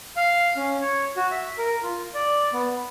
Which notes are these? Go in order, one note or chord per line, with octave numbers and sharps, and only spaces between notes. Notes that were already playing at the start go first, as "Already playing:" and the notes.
F5
C#4
C#5
F#4
E5
A#4
F4
D5
B3